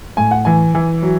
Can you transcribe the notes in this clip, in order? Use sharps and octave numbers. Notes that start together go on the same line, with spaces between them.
A2 G#5
F#5
E3 G#5
E3
F#3